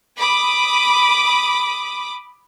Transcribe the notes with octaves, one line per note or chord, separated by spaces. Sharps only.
B5 D6 D#6